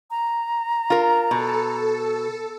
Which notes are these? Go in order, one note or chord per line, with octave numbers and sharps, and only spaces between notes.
A#5
F4 A#4
B2 A4